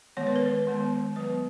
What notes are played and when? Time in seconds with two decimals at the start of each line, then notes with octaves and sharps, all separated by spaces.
0.17 D#3 G#3 B3 C#5
0.27 B4
0.36 A#4
0.46 B4
0.67 D#3 G#3 B3
1.16 F#3 B3 B4